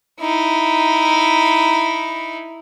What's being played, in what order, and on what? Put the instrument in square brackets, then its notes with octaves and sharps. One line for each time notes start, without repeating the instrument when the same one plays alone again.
[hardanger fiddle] D#4 E4